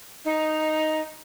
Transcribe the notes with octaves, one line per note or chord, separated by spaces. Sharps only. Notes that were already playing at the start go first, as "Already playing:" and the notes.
D#4